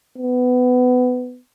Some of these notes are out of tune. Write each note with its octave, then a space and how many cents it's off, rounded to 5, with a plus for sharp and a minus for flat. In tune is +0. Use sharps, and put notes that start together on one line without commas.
B3 +20